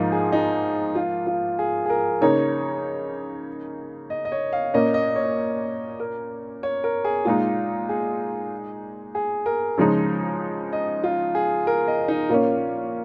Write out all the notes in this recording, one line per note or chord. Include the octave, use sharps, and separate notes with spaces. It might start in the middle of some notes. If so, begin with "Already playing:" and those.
Already playing: G#2 F3 A#3 D#4 F4
G#4
D#4
F4
F4
G#4
G#4
A#4
C#3 A#3 D#4 C#5
D#5
D#5
C#5
F5
A#2 A#3 C#4 D#5
D#5
C#5
A#4
C#5
A#4
G#4
A#2 G#3 D#4 F4
G#4
G#4
A#4
C#3 F3 G#3 D#4
D#5
F4
G#4
A#4
D#5
D#4
A#2 A#3 C#4 F4